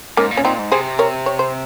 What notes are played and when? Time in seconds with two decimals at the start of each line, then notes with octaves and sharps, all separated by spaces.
0.17 G#2 A#3 C#4
0.31 A#2
0.37 C#4
0.44 A#2 C4 D#4
0.59 G#2
0.72 C3 G#4 C5
0.99 A#4 C#5
1.26 C#5
1.39 C5